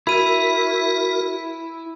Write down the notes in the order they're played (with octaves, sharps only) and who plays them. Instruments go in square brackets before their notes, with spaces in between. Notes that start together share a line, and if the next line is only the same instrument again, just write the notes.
[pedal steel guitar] E4 [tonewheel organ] F#4 A#4 [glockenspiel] B5 D#7